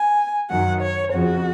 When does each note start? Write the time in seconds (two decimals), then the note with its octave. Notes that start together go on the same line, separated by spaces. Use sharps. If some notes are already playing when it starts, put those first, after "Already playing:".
Already playing: G#5
0.50 F#2 D#3 F#3 F#5
0.82 C#5
1.13 F2 C#3 F3 F#4